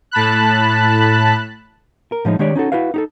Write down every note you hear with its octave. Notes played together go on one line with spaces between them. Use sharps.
A2 A5 B5 F#6
A#4
A2 F3 G#3 D#4
D#3 G#3 D4 G4 C#5 D5
C#4 D#4 F#4 A4
E4 F#4 B4 F5
D#4 G4 A4